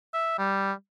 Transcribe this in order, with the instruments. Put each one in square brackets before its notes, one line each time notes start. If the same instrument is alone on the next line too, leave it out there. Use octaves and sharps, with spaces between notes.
[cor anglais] E5
G3